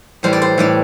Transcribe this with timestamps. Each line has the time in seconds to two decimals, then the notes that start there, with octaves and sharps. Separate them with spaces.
0.23 A2 E3 G3 C5
0.33 D5
0.42 C5
0.58 A2 E3 G3 D5